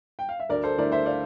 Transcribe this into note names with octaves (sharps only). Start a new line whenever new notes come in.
G5
F5
E5
D2 A#4 D5
A4 C5
D3 A3 E4 A#4 D5
C5 E5
D5 F5